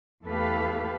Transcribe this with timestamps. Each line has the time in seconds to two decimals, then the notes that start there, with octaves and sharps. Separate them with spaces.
0.25 E2 A3 G4 A4 B4 F5